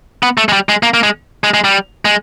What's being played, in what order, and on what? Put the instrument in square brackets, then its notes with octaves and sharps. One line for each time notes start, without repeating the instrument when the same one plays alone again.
[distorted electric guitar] B3
A3
G#3
G3
G#3
A#3
A#3
G#3
G#3
G#3
G3
G#3